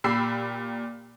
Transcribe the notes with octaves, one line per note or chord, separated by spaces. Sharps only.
A#2 G4 B5 E6 C7